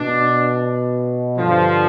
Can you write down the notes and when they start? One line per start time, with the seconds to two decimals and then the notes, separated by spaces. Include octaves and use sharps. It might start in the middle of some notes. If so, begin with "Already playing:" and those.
Already playing: B2 D4
1.37 G2 D3 F3